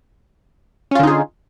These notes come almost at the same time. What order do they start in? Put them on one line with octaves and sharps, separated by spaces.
C#4 F4 D3 D#4 G#4